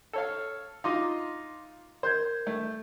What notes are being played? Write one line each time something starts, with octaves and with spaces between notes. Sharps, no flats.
A4 C#5 F5
D#4 F4 D#5 F5 C6 D6
A#4 C5 G6 G#6
A3